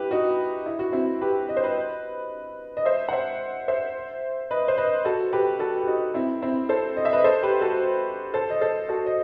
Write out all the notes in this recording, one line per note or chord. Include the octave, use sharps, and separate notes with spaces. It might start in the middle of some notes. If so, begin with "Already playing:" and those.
Already playing: E4 G4 B4
D#4 F#4
E4
F#4
C4 E4
G4 B4
D#5
C5
B4 D#5
D#5
C5 E5
F#5
C5 E5
C5 E5
B4 D#5
C5
B4 D#5
F#4 A4
G4 B4
F#4 A4
G4
D#4 F#4
C4 E4
C4 E4
A4 C5
D#5
E5
B4 D#5
A4 C5
G4 B4
F#4 A4
A4 C5
D#5
A4 C5
F#4 A4
D#5